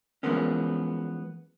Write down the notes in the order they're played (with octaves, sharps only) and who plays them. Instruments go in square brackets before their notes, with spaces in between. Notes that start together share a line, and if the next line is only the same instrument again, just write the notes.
[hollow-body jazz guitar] E3 F3 G#3 A#3 B3 C#4